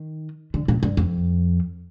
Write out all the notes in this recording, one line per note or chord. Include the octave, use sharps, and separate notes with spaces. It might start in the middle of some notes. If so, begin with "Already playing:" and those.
Already playing: D#3
D3
A#2
G2
F2